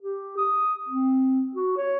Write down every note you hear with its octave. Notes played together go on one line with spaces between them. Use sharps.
G4
D#6
C4
F#4
C#5